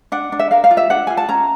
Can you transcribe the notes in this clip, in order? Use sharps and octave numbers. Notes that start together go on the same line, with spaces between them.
D4 F#5
D4
E5
A#4 F5
F5
F4
E5
D4 F#5
F4 G#5
A5
C#4 A#5